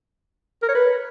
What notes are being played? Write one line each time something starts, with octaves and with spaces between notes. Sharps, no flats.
A#4
C#5
B4